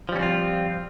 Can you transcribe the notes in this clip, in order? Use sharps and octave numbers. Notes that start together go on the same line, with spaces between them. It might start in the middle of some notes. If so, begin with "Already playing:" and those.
F3 G3 C4 C#4 F4